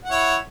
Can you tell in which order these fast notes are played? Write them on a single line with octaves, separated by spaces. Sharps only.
F#5 E4 C#5